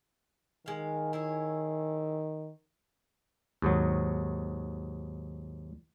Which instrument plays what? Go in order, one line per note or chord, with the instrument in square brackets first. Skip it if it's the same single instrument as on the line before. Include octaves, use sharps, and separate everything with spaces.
[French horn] D#3 [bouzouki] G#3 F5
[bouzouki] E4 G#4 C#5
[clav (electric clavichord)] D#2 G#2 F#3